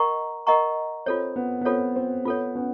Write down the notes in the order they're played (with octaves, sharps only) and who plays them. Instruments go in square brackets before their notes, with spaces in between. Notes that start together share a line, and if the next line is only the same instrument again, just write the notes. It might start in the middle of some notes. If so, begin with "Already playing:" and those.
Already playing: [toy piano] A#4 D#5 F#5 A#5 C#6
A#4 D#5 F#5 A#5 C#6
[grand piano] C4 [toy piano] F4 A4 C#5
[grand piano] B3
B3
[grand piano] C4 [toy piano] F4 A4 C#5
[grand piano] C4
[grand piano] B3 [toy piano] F4 A4 C#5
[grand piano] B3 C#4